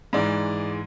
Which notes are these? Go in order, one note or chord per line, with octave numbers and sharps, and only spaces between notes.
G#2 E3 G#3 D5